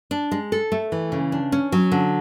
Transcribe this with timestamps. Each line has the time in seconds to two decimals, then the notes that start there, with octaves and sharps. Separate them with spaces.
0.11 D4
0.31 G#3
0.52 A4
0.72 A3
0.92 E3
1.12 C#3
1.32 D4
1.52 C#4
1.72 F#3
1.92 D3